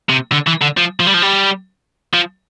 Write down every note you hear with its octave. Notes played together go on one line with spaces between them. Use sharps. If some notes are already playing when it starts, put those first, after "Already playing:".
C3
D3
E3
D3
F3
F3
G3
F3
G3
F3